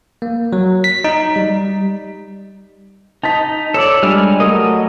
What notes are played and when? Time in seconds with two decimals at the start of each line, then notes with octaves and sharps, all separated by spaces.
0.22 A#3
0.53 F#3
0.84 B6
1.04 D#4
1.36 G3
3.23 D#4 A5 A6 B6
3.74 A4 C#5 D5 E6
4.03 G3 G#3 D4 G#5 F6
4.40 F#3 A3 A#4 D#5